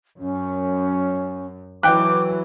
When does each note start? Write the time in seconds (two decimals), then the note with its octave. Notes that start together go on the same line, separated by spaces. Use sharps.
0.18 F#2 C#4
1.83 E3 F#3 G5 D6 F#6